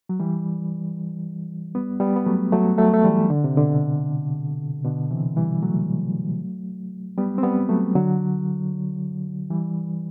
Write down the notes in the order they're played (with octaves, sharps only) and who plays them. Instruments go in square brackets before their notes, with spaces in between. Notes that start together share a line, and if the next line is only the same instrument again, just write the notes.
[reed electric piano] F#3
E3 G3
G3 B3
G3 B3
B3
F#3 A3
F#3 A3
F#3 A3
A3
E3 G3
D3
C3
B2 D3
B2 D3
C3 E3
E3 G3
F#3 A3
G3 B3
C4
G3 B3
F#3 A3
D3 F#3
E3 G3